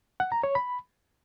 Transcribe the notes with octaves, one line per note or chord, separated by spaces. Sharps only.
F#5
A#5
C#5
B5